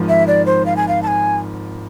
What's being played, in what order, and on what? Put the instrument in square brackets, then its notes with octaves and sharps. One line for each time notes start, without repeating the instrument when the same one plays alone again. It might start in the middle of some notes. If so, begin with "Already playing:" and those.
Already playing: [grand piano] G#1 G#2 F3
[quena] E5
D5
C5
F5
G#5
F5
A5
G#5